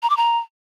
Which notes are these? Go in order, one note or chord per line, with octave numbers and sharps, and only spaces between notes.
A#5
D6
A#5